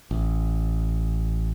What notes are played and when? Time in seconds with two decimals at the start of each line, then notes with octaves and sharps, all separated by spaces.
0.11 A1